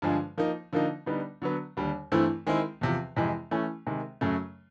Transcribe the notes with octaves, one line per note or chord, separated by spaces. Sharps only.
G2 D3 F3 G#3
F3 A#3 D#4
D3 F3 A#3 D#4
D3 G3 B3 D#4
D3 F#3 B3
D#2 D3 G3
G2 E3 A3 C4 E4
D#3 G#3 C4 E4
E2 C3 F3
F2 C3 E3 G#3
E3 A3 C#4
C3 D#3 G#3
F#2 C#3 F#3 A3